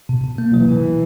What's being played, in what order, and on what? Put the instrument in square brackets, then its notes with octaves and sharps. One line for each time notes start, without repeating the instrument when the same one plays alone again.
[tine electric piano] B2
B2
A#3
[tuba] E3 [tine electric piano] F#3
[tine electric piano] B2
B2